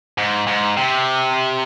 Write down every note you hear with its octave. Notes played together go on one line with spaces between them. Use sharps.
G#2
G#2
C3